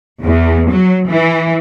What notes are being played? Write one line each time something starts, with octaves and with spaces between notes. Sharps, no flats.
E2
F#3
E3